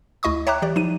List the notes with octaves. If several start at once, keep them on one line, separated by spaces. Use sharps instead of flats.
D2 E4 D#5 C#6 D#6
C#5 E5 G5 A#5 D6 F#6
E3 G4 D5
F3 D#4 D#7